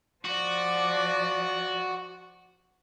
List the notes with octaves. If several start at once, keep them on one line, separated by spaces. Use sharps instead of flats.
F3 F#4 D5